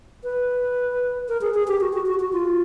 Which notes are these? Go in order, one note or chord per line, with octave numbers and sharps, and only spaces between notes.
B4
A#4
G#4
G#4
G4
F#4
F#4
F#4
F#4
F4